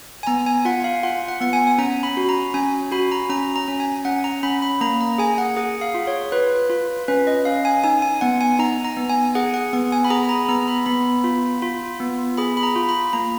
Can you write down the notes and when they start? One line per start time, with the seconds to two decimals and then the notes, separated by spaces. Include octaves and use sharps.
0.23 G#5
0.27 B3 A#5
0.46 G#5
0.65 F4 F#5
0.84 F5
1.03 F4 F#5
1.28 F#5
1.41 B3 F#5
1.53 G#5
1.67 G#5
1.78 C#4 A#5
2.03 B5
2.17 F#4
2.29 A#5
2.54 C#4 G#5
2.92 F#4 B5
3.12 A#5
3.30 C#4 A#5
3.56 A#5
3.68 C#4
3.80 G#5
4.05 C#4 F#5
4.24 A#5
4.43 C#4 B5
4.62 B5
4.81 A#3 A#5
5.01 A#5
5.18 G#4 G#5
5.38 F#5
5.57 G#4 F#5
5.81 F5
5.94 F4
6.07 C#5
6.32 F4 B4
6.70 F4
7.08 C#4 B4
7.27 D#5
7.45 C#4 F5
7.65 G#5
7.84 D#4 G#5
8.02 G#5
8.21 B3 F#5
8.41 G#5
8.59 D#4 A#5
8.85 A#5
8.97 B3
9.09 G#5
9.35 G#4 F#5
9.54 F#5
9.73 B3 F#5
9.92 G#5
10.04 B5
10.10 G#4 A#5
10.24 B5
10.29 A#5
10.48 B3 A#5
10.68 B5
10.86 B3 B5
11.24 F4
11.62 F4
12.00 B3
12.38 G#4 B5
12.57 B5
12.63 A#5
12.76 F4
12.89 B5
13.13 A#3 A#5